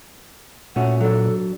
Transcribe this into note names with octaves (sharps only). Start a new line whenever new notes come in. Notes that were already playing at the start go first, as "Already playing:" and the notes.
A#2 A3 C#4 F#4 F#5
F#3 D4 A4